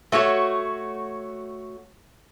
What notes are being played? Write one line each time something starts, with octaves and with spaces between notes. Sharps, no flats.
A3 F#4 G4 C#5